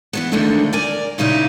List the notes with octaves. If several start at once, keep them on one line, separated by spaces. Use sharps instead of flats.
E3 F#3 B3
D#2 D3 F3 G#3 A3 D4
A#4 D5 G#5
A#2 C#3 G3 D#4 E4